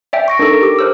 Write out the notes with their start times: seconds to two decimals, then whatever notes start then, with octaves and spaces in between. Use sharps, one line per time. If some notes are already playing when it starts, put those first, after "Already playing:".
0.13 D5 E5 G5
0.28 C#6 A#6 D7
0.39 D4 D#4 A4 A#4
0.62 G4 D6
0.79 A#4 C5 E6